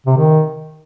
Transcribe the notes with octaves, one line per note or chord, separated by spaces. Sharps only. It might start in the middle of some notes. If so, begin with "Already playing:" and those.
C3
D#3